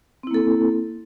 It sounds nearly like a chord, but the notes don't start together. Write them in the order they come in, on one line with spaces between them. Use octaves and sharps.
C4 E4 A#3 A4